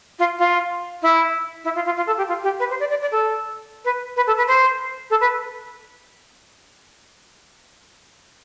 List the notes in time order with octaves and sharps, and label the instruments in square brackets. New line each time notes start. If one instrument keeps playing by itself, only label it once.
[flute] F4
F4
E4
E4
F4
F4
F4
A4
G4
F4
G4
B4
C5
D5
D5
D5
A4
B4
B4
A4
B4
C5
A4
B4